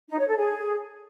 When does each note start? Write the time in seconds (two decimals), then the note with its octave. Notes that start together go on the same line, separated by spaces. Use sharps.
0.09 D#4
0.18 C#5
0.27 A4
0.36 G#4